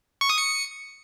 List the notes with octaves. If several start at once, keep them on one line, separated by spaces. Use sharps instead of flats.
C#6
D#6
C#7